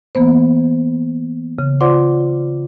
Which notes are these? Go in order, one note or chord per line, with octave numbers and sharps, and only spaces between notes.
E3 A#3 B3 C5
C#3
F4 C5 D5 F#5 C6 D6